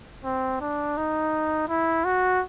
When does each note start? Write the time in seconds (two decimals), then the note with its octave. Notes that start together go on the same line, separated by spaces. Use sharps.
0.25 C4
0.61 D4
0.97 D#4
1.68 E4
2.05 F#4